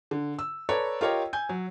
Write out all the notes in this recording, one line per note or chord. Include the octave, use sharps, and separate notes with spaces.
D3
E6
A4 B4 C#5 D5 A#5
F4 G4 A#4 C#5 D#5 G5
G#5 G6
F#3